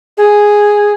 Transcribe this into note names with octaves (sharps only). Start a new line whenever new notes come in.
G#4